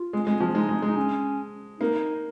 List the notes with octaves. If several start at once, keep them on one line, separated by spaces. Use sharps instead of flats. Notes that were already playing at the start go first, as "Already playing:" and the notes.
Already playing: F4
G#3
G#3
F3
G#3 D#4
G#3
G#3 D#4
C#4
A#3 D#4